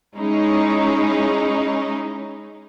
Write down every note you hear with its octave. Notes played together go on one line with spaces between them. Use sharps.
G#3 C#4 D#4 E4